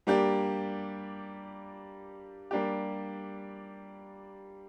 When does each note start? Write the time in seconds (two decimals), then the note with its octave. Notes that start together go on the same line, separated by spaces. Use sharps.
0.07 G3 A#3 D4 G4
2.51 G3 A#3 D4 G4